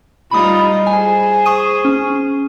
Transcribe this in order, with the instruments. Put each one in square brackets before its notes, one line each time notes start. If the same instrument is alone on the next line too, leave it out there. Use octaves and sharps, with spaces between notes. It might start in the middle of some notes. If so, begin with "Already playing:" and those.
[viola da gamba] G3 D#4 F4 [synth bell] B5 D#6
[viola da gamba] G#4 C5 [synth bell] G#5
[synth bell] C#6 D#6 D#7
C#4